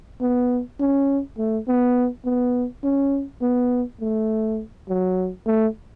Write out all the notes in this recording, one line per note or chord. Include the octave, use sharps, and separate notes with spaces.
B3
C#4
A3
B3
B3
C#4
B3
A3
F#3
A3